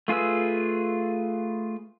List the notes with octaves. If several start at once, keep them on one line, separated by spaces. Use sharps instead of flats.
A3 F4 G#4 B4 E6